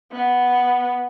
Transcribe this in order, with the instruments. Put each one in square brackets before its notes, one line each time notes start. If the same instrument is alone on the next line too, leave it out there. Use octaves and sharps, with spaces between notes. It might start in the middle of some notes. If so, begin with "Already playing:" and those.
[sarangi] B3